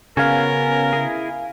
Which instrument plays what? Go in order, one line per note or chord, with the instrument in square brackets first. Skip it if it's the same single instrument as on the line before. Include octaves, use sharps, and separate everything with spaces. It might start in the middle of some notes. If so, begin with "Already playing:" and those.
[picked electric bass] C#3 [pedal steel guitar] B3 C#4 F#4 [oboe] A#4 [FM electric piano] F5 G#5
[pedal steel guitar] E4 G#4